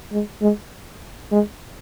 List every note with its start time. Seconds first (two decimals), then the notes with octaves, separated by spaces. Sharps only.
0.12 G#3
0.42 G#3
1.32 G#3